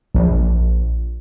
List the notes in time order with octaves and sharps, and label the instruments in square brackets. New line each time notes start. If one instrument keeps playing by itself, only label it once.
[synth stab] A#1